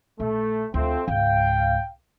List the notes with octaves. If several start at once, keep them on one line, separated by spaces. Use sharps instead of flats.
A#1 A3
D2 F3 A3 C4
C#2 G#2 F5 G5